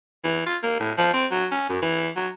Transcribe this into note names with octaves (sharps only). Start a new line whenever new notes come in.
E3
F4
A#3
A2
F3
C4
F#3
C#4
F#2
E3
F#3